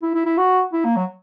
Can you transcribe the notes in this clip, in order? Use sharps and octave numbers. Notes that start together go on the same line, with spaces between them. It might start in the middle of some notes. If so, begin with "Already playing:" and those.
E4
E4
E4
F#4
E4
A#3
F#3